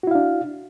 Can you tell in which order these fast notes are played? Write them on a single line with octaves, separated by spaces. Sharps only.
F#4 E4 F5 D4